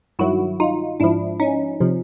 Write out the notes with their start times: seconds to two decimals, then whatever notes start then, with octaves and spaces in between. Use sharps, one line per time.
0.19 G2 D#3 F#3 E4 F#4
0.60 D#4 F4
1.00 G#2 F3 D4 E4
1.40 C#4 D#4
1.80 C3 F3